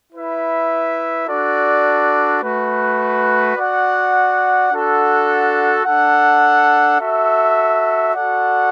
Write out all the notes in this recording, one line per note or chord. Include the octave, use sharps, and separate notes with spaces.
E4 B4 E5
D4 F#4 A4 D5
A3 F#4 B4
F#4 D5 F#5
D4 F#4 A4 F#5
D4 A4 F#5
F#4 A4 E5
F#4 A4 D5 F#5